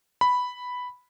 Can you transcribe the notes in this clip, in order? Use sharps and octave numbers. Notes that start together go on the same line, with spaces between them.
B5